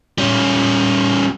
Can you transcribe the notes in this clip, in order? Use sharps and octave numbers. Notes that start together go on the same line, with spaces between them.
G3 C#4